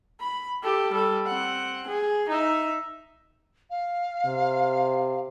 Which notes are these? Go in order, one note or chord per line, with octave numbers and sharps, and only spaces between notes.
B5
G4 A4
G3 A4
C4 F#5
G#4
D#4 E5
F5
C3